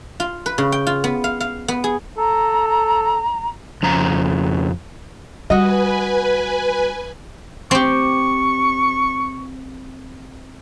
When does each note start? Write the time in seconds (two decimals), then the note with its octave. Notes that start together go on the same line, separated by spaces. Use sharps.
0.20 F4
0.46 B4
0.58 C#3
0.72 G5
0.87 F4
1.04 B3
1.24 F5
1.40 F5
1.68 B3
1.84 G#4
2.18 A4 A#5
3.83 F2 C#3 A#5
5.50 G3 F#4 B4 D#5 G#5
7.71 C4 G4 C#6